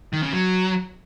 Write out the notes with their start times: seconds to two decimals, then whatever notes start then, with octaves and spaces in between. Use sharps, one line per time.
0.13 D#3
0.23 C#3
0.33 F#3